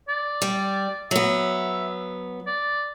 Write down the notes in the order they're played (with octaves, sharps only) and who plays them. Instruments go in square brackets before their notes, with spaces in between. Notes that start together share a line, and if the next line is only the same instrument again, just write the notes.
[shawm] D5
[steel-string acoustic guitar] G3
[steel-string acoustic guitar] F#3 B3 [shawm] E5
[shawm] D5